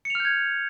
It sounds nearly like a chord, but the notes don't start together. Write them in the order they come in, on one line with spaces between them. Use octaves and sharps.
C#7 F7 F6 G6 G#6